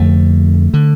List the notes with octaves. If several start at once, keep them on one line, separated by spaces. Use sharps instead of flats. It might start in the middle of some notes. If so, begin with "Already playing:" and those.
Already playing: F2 D3 A3
D3